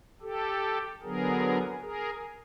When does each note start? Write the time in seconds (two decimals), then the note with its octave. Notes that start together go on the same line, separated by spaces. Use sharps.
0.22 G4 A4
1.02 D3 F#3 B3 G#4 A#4
1.82 G#4 A#4